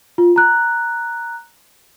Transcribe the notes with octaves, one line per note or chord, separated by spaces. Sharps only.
F4
A#5 F#6